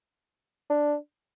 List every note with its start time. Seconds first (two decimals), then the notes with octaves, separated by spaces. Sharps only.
0.70 D4